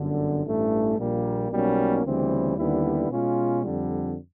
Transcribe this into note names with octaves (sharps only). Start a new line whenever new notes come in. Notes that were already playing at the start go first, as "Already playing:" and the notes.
Already playing: G1 F#2 D3
A1 G2 E3 A3
A#1 A#2 G3 A#3
B1 B2 G3 A#3 C#4
D2 C#3 E3 G3 C4
D#2 D3 G3 B3 E4
B2 G#3 C#4 F4
F2 D3 G3